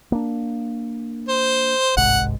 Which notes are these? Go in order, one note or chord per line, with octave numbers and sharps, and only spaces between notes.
A#3 D4
C5
G1 C2 G#2 F#5